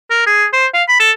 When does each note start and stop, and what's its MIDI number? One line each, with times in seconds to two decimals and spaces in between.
0.10 0.24 70
0.26 0.46 68
0.53 0.66 72
0.74 0.83 77
0.89 0.98 83
1.00 1.11 69